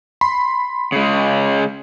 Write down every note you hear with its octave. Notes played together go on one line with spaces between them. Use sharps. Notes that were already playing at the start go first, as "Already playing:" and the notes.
B5 C6
C#3 G#3